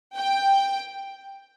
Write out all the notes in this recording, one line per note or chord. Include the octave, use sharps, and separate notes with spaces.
G5